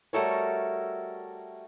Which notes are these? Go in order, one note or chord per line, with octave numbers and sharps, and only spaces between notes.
G3 A3 F#4 A4 A#4 C#5